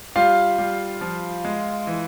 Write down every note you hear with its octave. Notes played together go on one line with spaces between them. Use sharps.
G3 F4 F5
G3
F3
G#3
E3